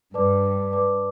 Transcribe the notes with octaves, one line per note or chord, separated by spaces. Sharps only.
G2 B4 D5 A5 D6
B4 D5 A5 D6